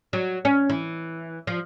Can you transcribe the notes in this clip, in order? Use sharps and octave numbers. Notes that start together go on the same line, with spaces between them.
F#3
C#4
E3
F3